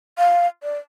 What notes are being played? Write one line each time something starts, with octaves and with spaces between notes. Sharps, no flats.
F5
D5